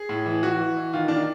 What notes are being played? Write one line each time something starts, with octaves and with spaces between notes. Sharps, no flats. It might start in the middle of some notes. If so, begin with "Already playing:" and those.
Already playing: G#4
A2
E3
E3 F#4
E3
E3
D#3 F4
D#3 D4